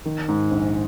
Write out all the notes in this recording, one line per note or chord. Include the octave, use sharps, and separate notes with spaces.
D#3
G#2
A#1